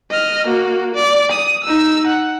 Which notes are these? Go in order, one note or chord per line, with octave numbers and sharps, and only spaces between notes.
D#5 F6
A#3 F#4
D5
D#6
D#4 E6
F#5